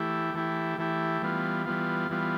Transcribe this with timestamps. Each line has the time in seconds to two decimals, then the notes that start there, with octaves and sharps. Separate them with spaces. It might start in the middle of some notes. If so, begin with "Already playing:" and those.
Already playing: E3 A3 E4 G4
0.34 E3 A3 E4 G4
0.78 E3 A3 E4 G4
1.22 E3 G3 B3 F4
1.66 E3 G3 B3 F4
2.09 E3 G3 B3 F4